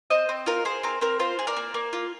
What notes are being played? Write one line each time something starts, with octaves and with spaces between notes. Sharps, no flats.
C4 C5 D#5
C4
F4 A#4
G#4 C5
C4 A#4
C4 A#4
F4 C5
G#4
A#4 D5
A#3
A#3
F4